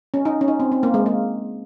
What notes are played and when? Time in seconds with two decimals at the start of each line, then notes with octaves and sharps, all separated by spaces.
0.14 C#4
0.25 D#4
0.41 C#4
0.48 D#4
0.60 C4
0.72 C4
0.83 A#3
0.94 G#3
1.06 A#3